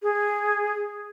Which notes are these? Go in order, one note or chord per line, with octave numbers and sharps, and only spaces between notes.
G#4